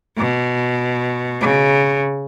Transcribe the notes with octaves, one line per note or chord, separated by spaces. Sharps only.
B2
C#3